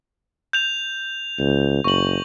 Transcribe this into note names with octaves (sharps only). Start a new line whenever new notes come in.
G6 F7
C#2
F#1 C#6 F#7